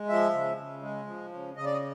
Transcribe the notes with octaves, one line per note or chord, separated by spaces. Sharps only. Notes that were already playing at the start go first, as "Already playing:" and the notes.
Already playing: G#3
F3 E5
C#3
C#3
G#3
F3
C#3
C#3 D#5
D5
D#5